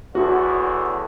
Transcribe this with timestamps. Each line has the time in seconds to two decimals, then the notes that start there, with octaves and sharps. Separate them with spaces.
0.15 E2 A2 D3 F#4